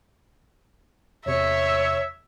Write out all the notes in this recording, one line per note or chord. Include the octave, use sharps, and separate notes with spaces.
E2 C3 C#5 E5